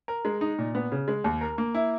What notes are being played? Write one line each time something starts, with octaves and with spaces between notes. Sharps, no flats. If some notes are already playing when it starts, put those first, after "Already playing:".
A#4
G#3
D#4
A#2
B3
C#3
G#3
D#2
A#4
A#3
E4